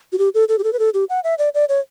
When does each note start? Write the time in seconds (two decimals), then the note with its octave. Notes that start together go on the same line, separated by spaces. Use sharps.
0.12 F#4
0.18 G4
0.34 A4
0.49 A4
0.59 G4
0.64 A4
0.73 B4
0.79 A4
0.94 G4
1.09 F#5
1.24 E5
1.38 D5
1.54 D5
1.69 C#5